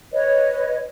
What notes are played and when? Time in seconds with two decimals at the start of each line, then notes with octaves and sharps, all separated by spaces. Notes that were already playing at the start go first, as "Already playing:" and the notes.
0.12 B4 C#5 D#5